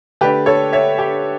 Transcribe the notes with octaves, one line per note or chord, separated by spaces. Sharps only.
D3 A3 D4 G4 B4
A4 C#5
C#5 E5
G4